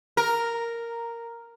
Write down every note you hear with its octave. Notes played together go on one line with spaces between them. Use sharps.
A#4